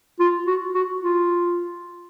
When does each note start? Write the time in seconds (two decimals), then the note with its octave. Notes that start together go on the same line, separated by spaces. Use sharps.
0.20 F4
0.47 F#4
0.74 F#4
1.02 F4